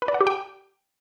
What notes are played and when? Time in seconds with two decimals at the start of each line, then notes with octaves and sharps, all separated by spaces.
0.02 B4
0.08 D5
0.14 F#5
0.21 G4
0.27 G5